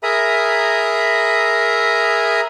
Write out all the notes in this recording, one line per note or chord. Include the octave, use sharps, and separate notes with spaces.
G#4 A#4 E5 A#5 B5 D#6